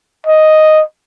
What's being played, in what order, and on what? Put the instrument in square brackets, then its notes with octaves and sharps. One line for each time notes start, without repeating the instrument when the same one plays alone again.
[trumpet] D#5